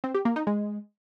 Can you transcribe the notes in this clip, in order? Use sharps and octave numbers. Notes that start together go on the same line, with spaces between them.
C4
G4
A#3
D#4
G#3